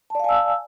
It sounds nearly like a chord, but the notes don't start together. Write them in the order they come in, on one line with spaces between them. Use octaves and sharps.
A5 D5 F5 G#5 E6